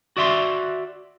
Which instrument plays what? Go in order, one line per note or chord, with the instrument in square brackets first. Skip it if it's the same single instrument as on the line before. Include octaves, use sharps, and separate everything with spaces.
[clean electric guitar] F#4 D5 E5 C6